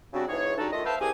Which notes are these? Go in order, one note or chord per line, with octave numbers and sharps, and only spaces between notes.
C#3 G3 C4 D4 F#4
G#2 E3 G#4 C#5
C#3 G3 D4 D#4 F#4 A4
D#3 A3 F4 D#5
B4 C5 E5 F5 G5 A5
C2 C4 G4 G#4 A#4 G#5